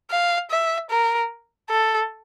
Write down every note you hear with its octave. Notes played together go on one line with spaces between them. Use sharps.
F5
E5
A#4
A4